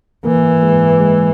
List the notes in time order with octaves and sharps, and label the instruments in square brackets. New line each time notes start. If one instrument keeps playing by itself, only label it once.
[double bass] E3 [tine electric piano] A#3 A#4
[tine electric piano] G#3 G#4
G#3 G#4